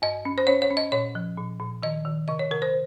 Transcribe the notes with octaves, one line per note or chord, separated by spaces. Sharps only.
G2 D#5
C#4
C5
C#4 C#5
C#5
C#4
D#5
A#2 C#5
F3
A#2
A#2
D#3 D#5
D#3
C3 D#5
C#5
C3 A#4
C5